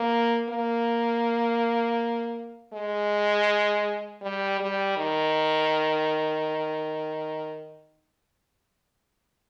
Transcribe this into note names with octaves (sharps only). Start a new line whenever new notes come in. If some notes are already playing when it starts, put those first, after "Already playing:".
Already playing: A#3
A#3
G#3
G3
G3
D#3